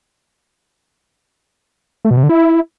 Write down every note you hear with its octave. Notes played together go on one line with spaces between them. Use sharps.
A3
B2
C3
D3
E4